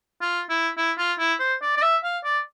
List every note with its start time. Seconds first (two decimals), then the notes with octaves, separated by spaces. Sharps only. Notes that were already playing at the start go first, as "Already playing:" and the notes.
0.22 F4
0.49 E4
0.77 E4
0.98 F4
1.19 E4
1.40 C5
1.62 D5
1.77 D5
1.82 E5
2.04 F5
2.24 D5